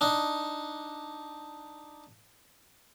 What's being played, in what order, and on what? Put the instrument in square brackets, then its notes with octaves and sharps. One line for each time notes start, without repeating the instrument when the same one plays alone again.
[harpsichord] D4 D#4